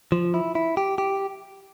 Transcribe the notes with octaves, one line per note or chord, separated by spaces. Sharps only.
F3
E4
E4
G4
G4